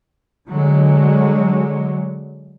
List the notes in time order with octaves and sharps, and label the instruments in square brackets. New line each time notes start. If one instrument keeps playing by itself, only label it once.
[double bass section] D3 F#3 G#3